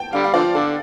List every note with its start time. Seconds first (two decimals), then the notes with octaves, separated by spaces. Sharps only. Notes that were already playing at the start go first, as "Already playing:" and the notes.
Already playing: G5 A5
0.13 D3 G3 F5
0.24 F5
0.34 D3 F3 D5
0.55 D3 A4